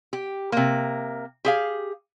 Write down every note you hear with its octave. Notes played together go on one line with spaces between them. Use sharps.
G4
C3 A#3
G4 G#4 F5